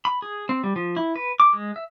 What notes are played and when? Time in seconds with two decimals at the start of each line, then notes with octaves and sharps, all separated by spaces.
0.05 B5
0.22 G#4
0.49 C4
0.64 G3
0.76 F3
0.97 E4
1.16 B4
1.40 D6
1.53 G#3
1.76 E5